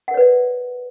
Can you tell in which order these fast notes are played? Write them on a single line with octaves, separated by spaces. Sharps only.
F#5 A#4 C#5 B4 D5